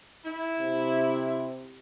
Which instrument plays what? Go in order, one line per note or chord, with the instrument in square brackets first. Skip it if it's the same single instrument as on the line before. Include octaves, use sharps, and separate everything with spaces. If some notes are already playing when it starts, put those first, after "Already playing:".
[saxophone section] E4
[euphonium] C3